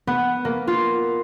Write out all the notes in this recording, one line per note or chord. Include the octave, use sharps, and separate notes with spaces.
B3
A#3
F4